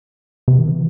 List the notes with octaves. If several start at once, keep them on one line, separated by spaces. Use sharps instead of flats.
C3
D#3
E3